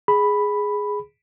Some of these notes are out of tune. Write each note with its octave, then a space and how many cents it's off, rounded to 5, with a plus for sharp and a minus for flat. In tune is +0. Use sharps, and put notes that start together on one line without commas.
G#4 +0 B5 +0